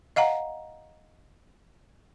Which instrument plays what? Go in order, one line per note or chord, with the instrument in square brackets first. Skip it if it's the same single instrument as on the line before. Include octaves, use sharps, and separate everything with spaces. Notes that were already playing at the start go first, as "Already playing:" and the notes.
[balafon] D#5 F5 F#5 A#5